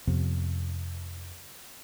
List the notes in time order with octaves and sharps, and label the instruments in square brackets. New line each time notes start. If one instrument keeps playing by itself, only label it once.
[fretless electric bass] F2 C3 F3 B3